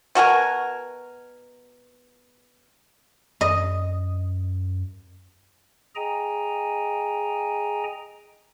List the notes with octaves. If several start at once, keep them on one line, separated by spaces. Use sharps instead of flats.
B2 F#4 A#4 G#5
F#2 D#5
G#4 D#5 G5 G#5 A#5